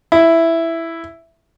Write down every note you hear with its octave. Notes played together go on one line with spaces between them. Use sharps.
E4